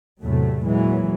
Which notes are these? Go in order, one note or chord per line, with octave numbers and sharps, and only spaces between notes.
E2 A2 C3 F#3 A3
A#2 E3 F#3 G#3